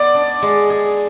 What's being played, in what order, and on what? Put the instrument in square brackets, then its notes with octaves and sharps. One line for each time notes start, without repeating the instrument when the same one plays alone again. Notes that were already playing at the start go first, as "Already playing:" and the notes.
Already playing: [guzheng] B3 [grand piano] D5
[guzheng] D4
G#3
G#4